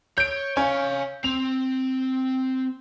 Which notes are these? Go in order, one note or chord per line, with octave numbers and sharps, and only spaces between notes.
C#5 G6 D7
C#4 F5 G#5
C4 F7